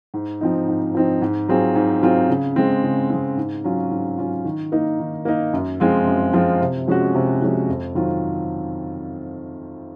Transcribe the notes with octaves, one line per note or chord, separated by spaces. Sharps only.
G#2
F3 C4 D#4
G#2
F3 C4 D#4
G#2
F#3 C4 F4 G#4
G#2
F#3 C4 F4 G#4
C#3
G#3 C4
C#3
G#3 C4
G#2
F#3 C#4 F4
G#2
F#3 C#4 F4
D#3
A#3 D#4
D#3
A#3 D#4
F#2
F3 G#3 C4 F4
F#2
F3 G#3 C4 F4
C3
F3 G#3 C#4 F#4
C3
F3 G#3 C#4 F#4
F2
D#3 F#3 C4 F4